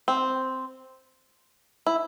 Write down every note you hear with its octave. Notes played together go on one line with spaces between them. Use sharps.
C4
E4